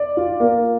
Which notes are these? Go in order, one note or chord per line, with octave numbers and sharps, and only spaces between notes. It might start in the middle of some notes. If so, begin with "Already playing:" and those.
Already playing: D5
F4
A#3